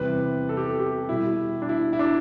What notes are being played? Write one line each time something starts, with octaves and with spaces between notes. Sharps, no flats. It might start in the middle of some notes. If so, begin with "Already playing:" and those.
Already playing: E2 C3 E3 G3 B4
A4
G4
A4
G4
B2 G3 E4
D4
E4
E4
D4